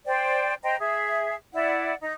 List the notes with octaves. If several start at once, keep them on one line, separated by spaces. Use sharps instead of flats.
C5 D5 G5
C5 D#5 G5 A#5
G#4 E5
E4 D5 F#5
D#4